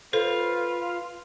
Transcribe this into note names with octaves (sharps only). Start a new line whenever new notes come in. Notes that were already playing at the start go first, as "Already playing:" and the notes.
F4 A4 B4 C5